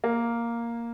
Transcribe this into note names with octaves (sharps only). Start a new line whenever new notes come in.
A#3